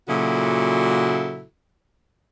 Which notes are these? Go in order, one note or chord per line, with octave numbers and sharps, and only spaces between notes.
A#2 C#3 F#3 E4 F#4 A4